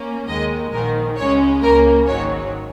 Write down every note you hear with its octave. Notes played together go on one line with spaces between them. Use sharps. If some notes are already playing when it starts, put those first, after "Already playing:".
Already playing: A#3 C#4
D#2 D#3 G#3 D#5
A#1 G#2 D#3 A#4
C#2 C#3 G#3 C#4 C#5
C#2 C#3 A#3 A#4
G#1 G#2 D#3 F#3 C#5